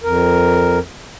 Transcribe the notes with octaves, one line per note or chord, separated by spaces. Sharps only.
F2 A#4